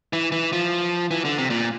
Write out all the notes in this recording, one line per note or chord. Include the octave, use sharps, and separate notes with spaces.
E3
E3
F3
E3
D3
C3
A#2